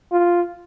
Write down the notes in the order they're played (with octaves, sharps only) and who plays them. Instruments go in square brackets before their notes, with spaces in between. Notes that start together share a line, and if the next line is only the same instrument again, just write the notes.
[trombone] F4